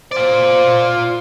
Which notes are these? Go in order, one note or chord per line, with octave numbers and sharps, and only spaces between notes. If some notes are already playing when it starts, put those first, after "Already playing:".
F4 C5 D5